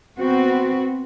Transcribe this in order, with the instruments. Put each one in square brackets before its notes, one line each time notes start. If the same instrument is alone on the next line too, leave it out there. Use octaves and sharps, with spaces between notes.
[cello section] B3 C4 F#4